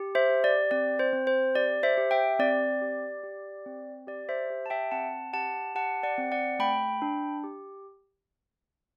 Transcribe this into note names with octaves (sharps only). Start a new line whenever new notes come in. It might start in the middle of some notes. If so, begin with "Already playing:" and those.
Already playing: G4
C5 E5
G4
D5
C4 D5
C5
C4
C5
G4 D5
C5 E5
G4
E5 G5
C4 D5
G4
G4
C4
G4 D5
C5 E5
G4
A5
E5 G5
C4 F#5 A5
G4 F#5 A5
G4 F#5 A5
D5 F#5
C4
D5 F#5
A3 G5 B5
D4
G4